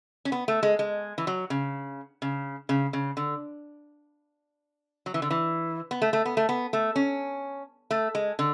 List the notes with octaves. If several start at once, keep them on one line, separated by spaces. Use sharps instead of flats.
C#4
B3
A3
G#3
G#3
E3
F#3
C#3
C#3
C#3
C#3
D3
F#3
E3
D3
E3
B3
A3
A3
B3
A3
B3
A3
C#4
A3
G#3
D3